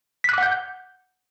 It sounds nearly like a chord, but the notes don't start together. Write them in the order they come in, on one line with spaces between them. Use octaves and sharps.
B6 F#6 D6 F#5 G6